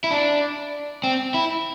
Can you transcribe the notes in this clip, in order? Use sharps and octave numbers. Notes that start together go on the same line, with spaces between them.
E4
D4
C4
E4